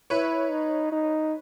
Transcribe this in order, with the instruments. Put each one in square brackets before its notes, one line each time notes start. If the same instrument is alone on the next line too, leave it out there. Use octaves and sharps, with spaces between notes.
[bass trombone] E4 [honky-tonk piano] B4 C#5
[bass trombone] D#4
D#4